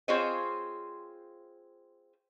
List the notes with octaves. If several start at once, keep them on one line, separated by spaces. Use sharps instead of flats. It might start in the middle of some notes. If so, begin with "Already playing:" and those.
C4 F4 G#4 C5 C#5 D#5